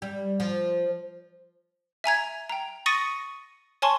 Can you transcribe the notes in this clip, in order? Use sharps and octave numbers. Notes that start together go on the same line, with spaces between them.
G3
F3
E5 G#5 A#5 G#6
G5 A#5
C#6 D#6 A6 A#6 C#7 D#7
C#5 G#5 A5 C6 C#6